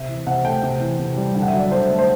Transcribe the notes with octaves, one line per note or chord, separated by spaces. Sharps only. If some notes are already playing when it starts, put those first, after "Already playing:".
Already playing: C3 E5
E3
C3 F#5
A3 G5
C3
E3
C3
G3
D3 G5
F#5
E5
F#3
D5
D3 C5
A3
C5